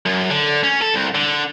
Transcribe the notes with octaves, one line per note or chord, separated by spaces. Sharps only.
F#2
D3
C#4
A4
C2
D3